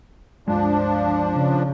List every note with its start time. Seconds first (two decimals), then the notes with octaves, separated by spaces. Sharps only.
0.48 C#2 G2 F3 G#3 D4
1.34 C#3